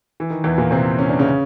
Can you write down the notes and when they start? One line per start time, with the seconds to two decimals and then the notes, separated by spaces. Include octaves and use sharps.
0.20 E3
0.30 D#3
0.44 E2 E3
0.58 A#2 A#3
0.71 C3 C4
0.99 C#4
1.09 D4
1.19 C#3 C#4